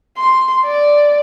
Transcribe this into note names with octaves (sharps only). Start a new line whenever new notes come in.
C6
D5